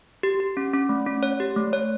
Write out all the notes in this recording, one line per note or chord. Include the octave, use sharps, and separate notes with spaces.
G4
G4
C#4
C#4
A3
C#4
C#5
G4
A3
C#5